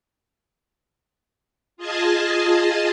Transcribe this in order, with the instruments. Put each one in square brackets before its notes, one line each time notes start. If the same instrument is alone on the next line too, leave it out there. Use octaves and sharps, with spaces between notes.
[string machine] F4 G#4 D#5 G#5 A5